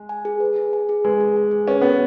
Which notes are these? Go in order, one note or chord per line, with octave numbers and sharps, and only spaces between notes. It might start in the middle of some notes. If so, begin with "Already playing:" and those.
Already playing: G#3
G#5
G#4
B4
G#4
G#5
G#4
G#3 B4
G#4
G#5
G#4
C#4 B4
B3 F#4